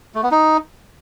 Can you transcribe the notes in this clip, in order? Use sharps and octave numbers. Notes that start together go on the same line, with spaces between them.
A3
B3
D#4